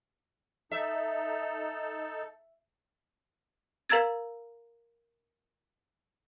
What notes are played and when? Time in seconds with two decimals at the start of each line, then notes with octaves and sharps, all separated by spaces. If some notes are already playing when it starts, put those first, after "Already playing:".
0.72 D#4 A4 E5
3.89 A#4 F5 A#5 E6 G#6 A6